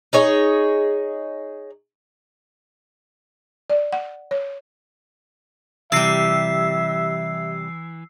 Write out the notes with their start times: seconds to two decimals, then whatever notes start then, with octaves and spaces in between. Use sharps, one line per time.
0.13 D#4 G#4 C#5 D#5
3.70 D5
3.93 F#5
4.31 C#5
5.92 C3 E3 G3 E5 E6 C7